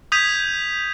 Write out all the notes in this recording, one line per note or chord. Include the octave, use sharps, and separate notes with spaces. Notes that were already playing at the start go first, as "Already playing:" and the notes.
D#6 G6 G#6 B6 D#7 F7